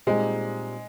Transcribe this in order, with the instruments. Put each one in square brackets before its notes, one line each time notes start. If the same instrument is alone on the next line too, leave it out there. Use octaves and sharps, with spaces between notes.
[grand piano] A#2 G3 C4 D#4 [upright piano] G#3